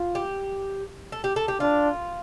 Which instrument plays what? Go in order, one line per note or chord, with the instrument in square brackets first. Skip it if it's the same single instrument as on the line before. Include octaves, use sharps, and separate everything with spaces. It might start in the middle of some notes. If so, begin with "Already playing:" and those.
Already playing: [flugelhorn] F4
[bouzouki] G4
A4
G4
A4
G4
[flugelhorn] D4 [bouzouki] F4